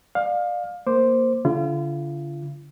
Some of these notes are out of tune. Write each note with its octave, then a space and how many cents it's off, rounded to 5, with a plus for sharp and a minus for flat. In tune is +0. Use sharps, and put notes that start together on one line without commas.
D5 +35 F5 +20
A#3 +0 C5 +0 D6 +0
D3 -40 F4 -40